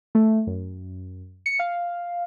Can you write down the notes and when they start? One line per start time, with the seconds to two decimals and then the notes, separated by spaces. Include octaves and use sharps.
0.15 A3
0.47 F#2
1.46 C#7
1.59 F5